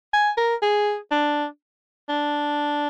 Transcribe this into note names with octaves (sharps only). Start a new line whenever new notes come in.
G#5
A#4
G#4
D4
D4